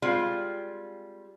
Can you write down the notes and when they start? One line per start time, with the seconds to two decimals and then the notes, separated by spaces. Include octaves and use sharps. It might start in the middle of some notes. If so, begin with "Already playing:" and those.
0.02 G3 G#3 C4 F4